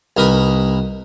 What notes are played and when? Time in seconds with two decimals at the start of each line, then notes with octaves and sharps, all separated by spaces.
0.17 C2 D#4 A#4 B4 D#6